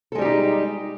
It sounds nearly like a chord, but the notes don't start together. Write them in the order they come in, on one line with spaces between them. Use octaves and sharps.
A4 G#3 G3 G4 D#4